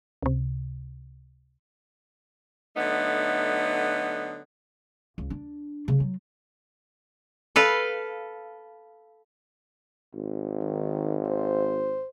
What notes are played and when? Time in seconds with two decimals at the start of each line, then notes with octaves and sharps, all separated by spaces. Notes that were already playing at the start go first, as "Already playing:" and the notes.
0.23 C#2 C3
2.77 D3 F#3 A3 B3 D#4
5.18 C#2
5.30 D4
5.88 C#3
6.00 F#3
7.56 A4 B4 F5
10.14 G#1
10.62 D#3
11.26 C5